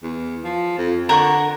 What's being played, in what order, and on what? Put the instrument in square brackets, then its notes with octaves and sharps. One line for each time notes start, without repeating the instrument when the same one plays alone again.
[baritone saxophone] E2
F3
F2
[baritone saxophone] D3 [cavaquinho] A#4 F#5 C#6